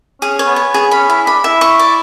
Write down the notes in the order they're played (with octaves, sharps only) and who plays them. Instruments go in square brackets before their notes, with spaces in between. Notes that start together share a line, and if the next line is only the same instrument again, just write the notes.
[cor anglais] C#4 [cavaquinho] G#4
[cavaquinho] C#5
[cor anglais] B3
[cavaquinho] C#5
[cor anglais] B3
[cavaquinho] G#4
[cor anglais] C#4 [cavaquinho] B5
[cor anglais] E4 [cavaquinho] B5
[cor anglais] D4 [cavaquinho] B5
[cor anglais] E4 [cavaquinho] E5
[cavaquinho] C#6
D5